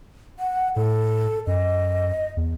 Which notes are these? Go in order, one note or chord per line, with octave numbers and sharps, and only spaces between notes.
F#5
A2 A4
F#2 D#5
E2